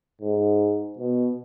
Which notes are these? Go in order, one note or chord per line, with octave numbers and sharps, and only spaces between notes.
G#2
B2